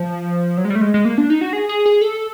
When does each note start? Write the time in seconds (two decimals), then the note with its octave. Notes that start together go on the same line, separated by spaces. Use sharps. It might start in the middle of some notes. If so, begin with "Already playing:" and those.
Already playing: F3
0.57 F#3
0.65 G#3
0.70 G3
0.75 A3
0.81 G#3
0.94 G#3
1.05 A#3
1.18 D4
1.30 D#4
1.41 F#4
1.53 G#4
1.69 G#4
1.86 G#4
2.01 A4